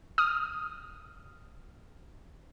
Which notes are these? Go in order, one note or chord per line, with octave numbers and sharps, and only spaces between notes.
D#6 F6